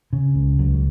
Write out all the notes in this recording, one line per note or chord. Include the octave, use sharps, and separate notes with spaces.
C#3
C#2
C#2 F#3
F#3